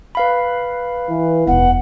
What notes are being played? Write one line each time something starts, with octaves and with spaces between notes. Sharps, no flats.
B4 F5 B5
E3
E1 F#2 B3 F#5